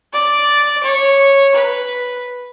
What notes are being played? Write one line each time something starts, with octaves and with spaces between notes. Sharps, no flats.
D5
C#5
B4